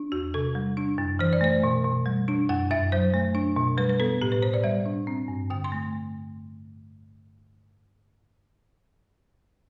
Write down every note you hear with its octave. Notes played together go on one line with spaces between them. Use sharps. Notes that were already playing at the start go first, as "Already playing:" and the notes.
Already playing: D4
E2 F#4
C3 A4
G3
D4
F#2
E3 C5
D5
A3 C5
B2
B2
G3
D4
F#2 F#5
F#2 E5
F#3 C5
A3
D4
B2
G3 B4
B4
B3 A4
A2 G4
B4
A2 C5
D5
G3 E5
D4
C4
G2
D3 G5
C6
A3